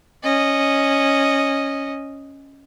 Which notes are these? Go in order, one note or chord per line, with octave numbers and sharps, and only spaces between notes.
C#4 D#5